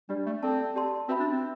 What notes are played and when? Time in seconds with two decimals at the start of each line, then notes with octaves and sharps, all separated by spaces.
0.09 G3 D4 G4 D5
0.26 A3
0.42 C4 A4 D5 A5
0.76 G4 D5 A5 C6
1.08 C4 F#4 B4 E5 B5
1.20 D4
1.31 C4